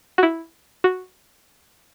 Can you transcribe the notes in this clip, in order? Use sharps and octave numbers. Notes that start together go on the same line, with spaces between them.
F#4
E4
F#4